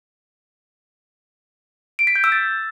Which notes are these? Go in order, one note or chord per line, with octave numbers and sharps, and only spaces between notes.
D7
B6
G6
E6
A6